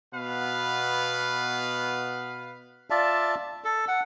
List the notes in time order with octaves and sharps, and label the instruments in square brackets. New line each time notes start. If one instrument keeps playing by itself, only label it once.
[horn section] B2 B3 B4 F5
[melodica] F4 D5 E5 A5
A4
F#5